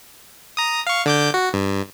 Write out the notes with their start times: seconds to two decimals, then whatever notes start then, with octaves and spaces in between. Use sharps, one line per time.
0.57 A#5 D#6
0.87 F5 C#6
1.06 D3 D6 G6
1.34 F#4
1.53 G2